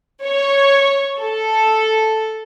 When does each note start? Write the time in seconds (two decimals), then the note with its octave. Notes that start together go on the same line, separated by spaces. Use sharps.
0.24 C#5
1.20 A4